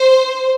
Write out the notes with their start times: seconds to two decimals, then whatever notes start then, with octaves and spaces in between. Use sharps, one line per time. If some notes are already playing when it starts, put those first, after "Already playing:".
Already playing: C5